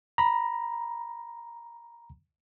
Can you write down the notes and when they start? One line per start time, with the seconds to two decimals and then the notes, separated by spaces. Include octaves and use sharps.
0.18 A#5 B5